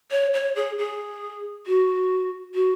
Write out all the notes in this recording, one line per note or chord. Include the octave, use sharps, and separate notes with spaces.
C#5
C#5
G#4
G#4
F#4
F#4